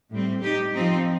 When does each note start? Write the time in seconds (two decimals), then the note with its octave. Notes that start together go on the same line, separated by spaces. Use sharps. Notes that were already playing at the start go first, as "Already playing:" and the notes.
0.11 A2 G3 C4
0.42 D#4 G4
0.74 F3 C4 D#4